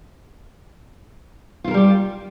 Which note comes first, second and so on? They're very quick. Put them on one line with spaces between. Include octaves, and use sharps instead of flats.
F4 E4 A#4 G3 G4